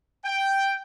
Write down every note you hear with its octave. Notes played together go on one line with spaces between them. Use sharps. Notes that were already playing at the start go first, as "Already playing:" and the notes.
G5